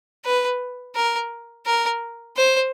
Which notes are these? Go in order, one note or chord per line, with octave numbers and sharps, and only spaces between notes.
B4
A#4
A#4
C5